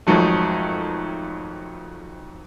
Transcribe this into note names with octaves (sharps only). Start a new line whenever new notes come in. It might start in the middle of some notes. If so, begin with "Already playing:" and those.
F2 G#2 D#3 F#3 A3